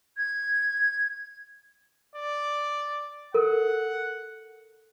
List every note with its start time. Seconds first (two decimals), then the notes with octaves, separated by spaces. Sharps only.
0.17 G#6
2.16 D5
3.34 A4 A#4 F#5